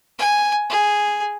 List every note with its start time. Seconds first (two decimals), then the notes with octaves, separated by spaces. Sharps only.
0.19 G#5
0.70 G#4